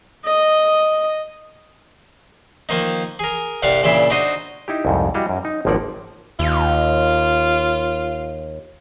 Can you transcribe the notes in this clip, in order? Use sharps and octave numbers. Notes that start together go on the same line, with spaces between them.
D#5
D#3 F3 A#3 D#4
G#4 A#4
C2 G2 G3 F5 F#5
A#2 C#3 D4 E4 C6
D4 D#4 F#4 C5 D#5
D#4 E4 G4
C2 F2 G#2
G3 E4 F#4 D#5 F5
F#2
D#4
G#1 C#2 F3 A#3 D5 F#5
D#2 F4